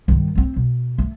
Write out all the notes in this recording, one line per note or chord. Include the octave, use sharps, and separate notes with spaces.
G2 D#3
A3 C4
B2
A3